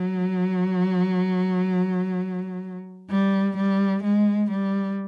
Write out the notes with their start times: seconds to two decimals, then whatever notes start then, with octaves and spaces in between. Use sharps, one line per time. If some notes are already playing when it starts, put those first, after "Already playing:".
Already playing: F#3
3.10 G3
3.57 G3
4.04 G#3
4.50 G3